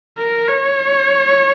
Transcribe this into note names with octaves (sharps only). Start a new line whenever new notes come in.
A#4
C#5